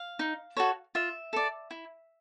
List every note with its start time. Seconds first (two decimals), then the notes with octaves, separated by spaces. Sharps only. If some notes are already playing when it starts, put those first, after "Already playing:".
Already playing: F5
0.19 D#4
0.57 F#4 A4 C#5
0.95 F4 E5
1.33 A4 D5
1.71 E4